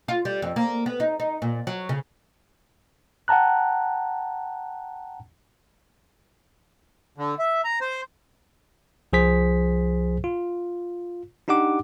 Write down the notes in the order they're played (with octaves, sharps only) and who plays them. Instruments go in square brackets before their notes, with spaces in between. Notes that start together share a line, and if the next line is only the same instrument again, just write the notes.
[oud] F4
G3
F2
A#3
B3
D#4
D#4
A#2
F#3
C#3
[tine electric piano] F#5 G5 A5 A#5 F#6
[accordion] D3
E5
A#5
C5
[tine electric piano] C2 F3 G#4 C5 B6
F4
D4 D#4 G4 F#5 D6